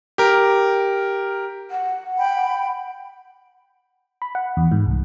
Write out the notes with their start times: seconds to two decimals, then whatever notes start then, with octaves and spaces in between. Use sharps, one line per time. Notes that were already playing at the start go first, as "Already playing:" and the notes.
0.18 G4 A#4
1.71 F#5
2.18 G5 B5
4.22 B5
4.35 F#5
4.57 E2
4.71 G#2
4.86 C2